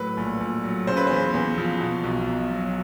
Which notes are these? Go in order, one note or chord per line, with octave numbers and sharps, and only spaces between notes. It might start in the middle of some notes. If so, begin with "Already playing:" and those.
Already playing: A2 F#3 B4
A#1
A#1
F#3
C#3 C5
B4
E2 C5
E2
F3
B2
B1
B1
F#3